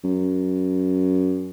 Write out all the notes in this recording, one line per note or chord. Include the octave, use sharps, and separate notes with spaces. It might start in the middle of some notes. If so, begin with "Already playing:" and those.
F#2